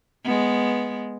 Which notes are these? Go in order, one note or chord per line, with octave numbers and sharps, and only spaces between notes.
G#3 B3